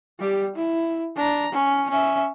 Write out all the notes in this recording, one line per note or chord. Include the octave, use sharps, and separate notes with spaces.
G3 G4
E4
D4 A#5
C#4
C#4 E5